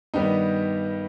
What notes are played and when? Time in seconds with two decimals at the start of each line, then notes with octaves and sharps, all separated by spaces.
0.14 G2 D#3 G3 B3 D#4